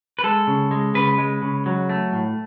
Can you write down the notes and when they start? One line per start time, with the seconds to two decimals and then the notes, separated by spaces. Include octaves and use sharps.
0.19 B4
0.23 G#3 A4
0.47 C#3
0.71 G#3
0.94 C#3 B4
1.18 G#3
1.42 C#3
1.66 F#3
1.89 A3
2.13 A2